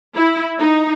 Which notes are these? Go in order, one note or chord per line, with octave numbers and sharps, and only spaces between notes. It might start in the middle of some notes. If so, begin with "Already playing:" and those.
E4
D#4